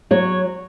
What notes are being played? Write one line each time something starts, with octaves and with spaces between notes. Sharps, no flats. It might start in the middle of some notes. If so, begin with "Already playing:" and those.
F#3 C#5